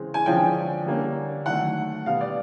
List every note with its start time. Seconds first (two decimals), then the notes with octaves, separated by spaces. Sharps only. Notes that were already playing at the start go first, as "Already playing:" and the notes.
Already playing: C#3 E3 G#3 C4
0.14 G#5
0.26 D3 F3 G#3 C#4 G5
0.86 D3 G3 A#3 C#4
1.46 D#3 F#3 A3 F#5
2.06 B2 G3 B3 F5
2.21 D5